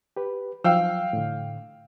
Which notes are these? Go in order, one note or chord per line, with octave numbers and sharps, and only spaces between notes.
G4 B4
F3 F#3 F5 G5 E6
A2 D3